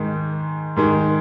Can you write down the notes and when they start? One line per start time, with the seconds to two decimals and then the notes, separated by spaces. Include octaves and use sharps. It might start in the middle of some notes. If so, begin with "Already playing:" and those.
Already playing: G#2 D#3 G#3
0.76 G#2 D#3 G#3